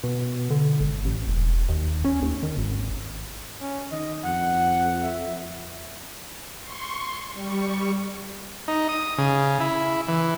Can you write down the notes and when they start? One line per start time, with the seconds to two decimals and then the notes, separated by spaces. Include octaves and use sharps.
0.04 B2
0.50 D3
0.80 G#1
1.05 A1
1.28 E1
1.69 D#2
2.05 C#4
2.22 D#2
2.43 D#3
2.57 G#1
3.61 C#4
3.92 D#3 D#5
4.24 F2 F#5
5.03 E5
6.62 C6 C#6
7.34 G3 C#6
8.68 D#4
8.89 D#6
9.18 C#3
9.60 E4
10.08 E3